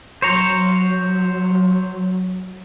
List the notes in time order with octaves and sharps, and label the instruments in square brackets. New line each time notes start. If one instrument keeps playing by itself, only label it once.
[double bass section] F#3 [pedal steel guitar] C5 C#5 A#5